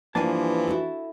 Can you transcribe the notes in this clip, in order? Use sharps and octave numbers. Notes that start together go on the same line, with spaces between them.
G2 E3 F3 A#3 D4 G#5 A5
E4 F#4 A4